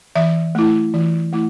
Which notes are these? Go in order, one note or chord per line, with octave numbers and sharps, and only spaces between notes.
E3 E5
A3 E4
E3
A3 E4